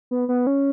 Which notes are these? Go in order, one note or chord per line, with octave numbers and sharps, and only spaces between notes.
B3
B3
C#4